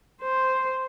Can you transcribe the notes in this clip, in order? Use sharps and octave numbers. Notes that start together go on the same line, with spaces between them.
C5